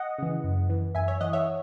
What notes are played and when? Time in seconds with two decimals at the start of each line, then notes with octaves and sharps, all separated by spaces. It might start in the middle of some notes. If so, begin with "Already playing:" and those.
Already playing: D#5 F#5
0.18 C#3 E3
0.44 F#2
0.69 E3
0.95 F#2 E5 G#5
1.08 C#5 E5
1.21 E3 D#5 F#5
1.33 C#5 E5